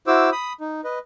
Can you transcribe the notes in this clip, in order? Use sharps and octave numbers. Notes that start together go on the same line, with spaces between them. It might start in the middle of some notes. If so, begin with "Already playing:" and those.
E4 F#4 C5 D6 E6
B5 D#6
D#4
B4 D#5